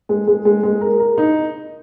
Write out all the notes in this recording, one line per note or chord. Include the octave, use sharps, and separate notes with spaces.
G#3
G#3
G#3
G#3
A#4
A#4
D#4